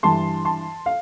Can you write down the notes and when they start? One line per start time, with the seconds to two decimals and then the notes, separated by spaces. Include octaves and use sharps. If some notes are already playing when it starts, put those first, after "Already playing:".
0.03 G2 E3 A5 C6
0.45 A5 C6
0.86 F5